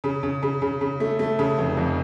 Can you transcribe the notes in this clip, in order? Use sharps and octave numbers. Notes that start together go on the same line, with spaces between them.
C#3
C#3
C#3
C#3
C#3
A3
A3
C#3
F1
F2